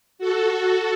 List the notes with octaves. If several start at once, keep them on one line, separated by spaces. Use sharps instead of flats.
F#4 A4